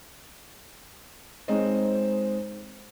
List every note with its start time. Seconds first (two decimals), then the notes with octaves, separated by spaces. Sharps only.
1.48 G#3 C4 D#4 C5 C#5 D#5